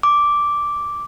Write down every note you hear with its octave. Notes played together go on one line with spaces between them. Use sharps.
D6